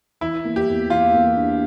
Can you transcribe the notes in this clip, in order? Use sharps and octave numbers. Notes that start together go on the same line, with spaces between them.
E3 E4
A#3
G4
E2
E2 F4
A#3
D4